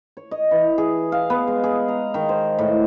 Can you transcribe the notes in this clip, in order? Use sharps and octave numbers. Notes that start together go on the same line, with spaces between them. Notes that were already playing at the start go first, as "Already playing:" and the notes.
C#5
D#5
E3
G#4
F5
B3
G#3
G#4
A#5
D#3
C5
A2